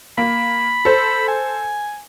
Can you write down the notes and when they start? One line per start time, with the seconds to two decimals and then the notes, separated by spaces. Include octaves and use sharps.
0.18 A#3 B5
0.85 A4 C5
1.28 G#5